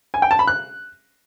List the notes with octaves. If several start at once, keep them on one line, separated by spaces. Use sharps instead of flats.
G#5
G5
A5
B5
F#6